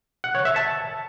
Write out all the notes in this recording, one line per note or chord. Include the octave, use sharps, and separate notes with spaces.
F#5
C#5
E5
A5